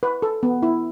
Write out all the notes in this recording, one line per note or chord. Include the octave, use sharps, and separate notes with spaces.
B4
A4
B3
E4